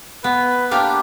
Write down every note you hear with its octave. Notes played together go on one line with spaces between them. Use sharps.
B3 B4
A#3 D4 G4 D6